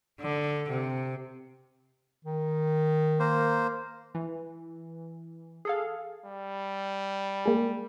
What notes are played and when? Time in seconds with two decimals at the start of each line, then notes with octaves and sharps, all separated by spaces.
0.21 D3
0.70 C3
2.25 D#3
3.20 A#3 C5
4.15 E3
5.65 G#4 A4 F5
6.26 G3
7.45 G#3 A#3